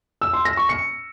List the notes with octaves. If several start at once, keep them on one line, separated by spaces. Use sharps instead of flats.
E6
C6
A#6
C#6
C#7